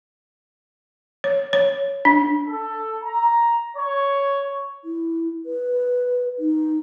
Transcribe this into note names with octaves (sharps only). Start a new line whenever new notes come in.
C#5
C#5
D4
A4
A#5
C#5
E4
B4
D#4